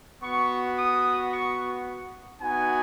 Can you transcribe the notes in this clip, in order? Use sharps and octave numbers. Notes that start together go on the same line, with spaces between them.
B3 F#4 C#6
D#6
C#6
B3 D#4 F#4 G#5